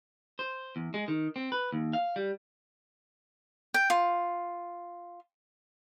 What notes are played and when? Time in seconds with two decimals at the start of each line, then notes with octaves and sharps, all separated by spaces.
0.39 C5
0.76 E2
0.94 G#3
1.08 D#3
1.36 C4
1.52 B4
1.72 D#2
1.93 F5
2.16 G3
3.74 G5
3.90 F4